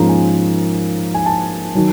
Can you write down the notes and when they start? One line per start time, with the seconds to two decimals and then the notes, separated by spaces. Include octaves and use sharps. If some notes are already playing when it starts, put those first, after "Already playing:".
Already playing: G#2 F3 A#3 C#4 A#5
0.09 G#5
1.14 G#5
1.26 A5
1.75 D#3 F#3